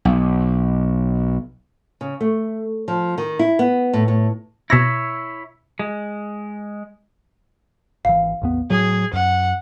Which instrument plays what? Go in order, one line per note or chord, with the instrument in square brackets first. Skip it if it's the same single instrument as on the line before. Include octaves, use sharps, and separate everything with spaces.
[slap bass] B1
[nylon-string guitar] C#3
A3
F3
D#3
E4
B3
A2
A2
[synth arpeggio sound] B2 A#6 [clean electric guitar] E4 C#5 E5
[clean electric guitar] G#3
[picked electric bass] G#1 E3 [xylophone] F5
[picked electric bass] A1 E2 B3
[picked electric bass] A2 F#3 [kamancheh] G#4
[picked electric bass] F#2 [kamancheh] F#5